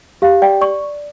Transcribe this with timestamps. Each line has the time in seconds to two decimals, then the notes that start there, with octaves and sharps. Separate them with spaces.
0.22 G4 F5
0.42 D5 G5
0.61 D5 C#6